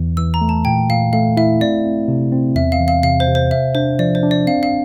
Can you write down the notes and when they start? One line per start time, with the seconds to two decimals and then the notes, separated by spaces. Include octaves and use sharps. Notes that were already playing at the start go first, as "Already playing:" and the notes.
Already playing: E2 E3
0.17 E3 E6
0.34 A#5
0.41 A3
0.49 A5
0.65 A#2 G5
0.89 A#2 F5
1.13 A3 F5
1.37 E4 E5
1.61 C4 D5
1.85 C4
2.08 C3
2.32 C4
2.55 E2 E5
2.72 F5
2.80 E3
2.88 F5
3.03 C3 F5
3.20 C5
3.27 C3
3.35 C5
3.51 C3 E5
3.75 D4 C5
3.99 F3 D5
4.15 C5
4.23 D4
4.31 D5
4.47 C4 F5
4.63 F5